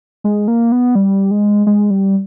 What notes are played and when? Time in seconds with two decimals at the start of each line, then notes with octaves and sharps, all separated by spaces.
0.24 G#3
0.48 A#3
0.72 B3
0.95 G3
1.31 G#3
1.67 G#3
1.90 G3